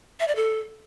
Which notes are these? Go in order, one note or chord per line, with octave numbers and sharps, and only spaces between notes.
E5
D5
A4